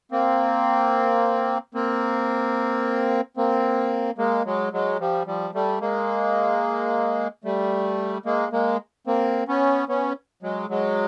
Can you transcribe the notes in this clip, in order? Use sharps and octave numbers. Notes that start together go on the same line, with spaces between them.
A#3 C4
A#3 C4
A#3 C4
G#3 A#3
F#3 G#3
F#3 G#3
F3 G3
F3 G3
G3 A3
G#3 A#3
G3 A3
G#3 A#3
G#3 A#3
A#3 C4
B3 C#4
B3 C#4
F#3 G#3
F#3 G#3